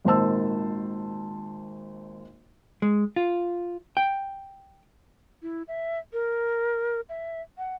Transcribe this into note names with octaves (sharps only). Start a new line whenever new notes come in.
G#1 A#2 D#3 C5 A5 E6
G#3
F4
G5
E4
E5
A#4
E5
F#5